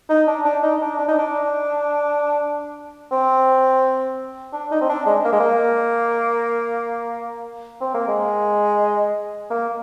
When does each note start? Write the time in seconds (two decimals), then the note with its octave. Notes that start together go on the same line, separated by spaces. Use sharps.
0.09 D#4
0.27 D4
0.45 D4
0.63 D#4
0.81 D4
0.99 D4
1.08 D#4
1.19 D4
3.12 C4
4.53 D4
4.71 D#4
4.81 C4
4.89 D4
5.06 G#3
5.25 A#3
5.33 G#3
5.40 A#3
7.81 C4
7.94 A#3
8.08 G#3
9.50 A#3